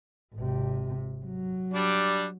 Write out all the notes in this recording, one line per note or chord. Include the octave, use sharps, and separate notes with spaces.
G#1 C3
F#3
G3 D4 D5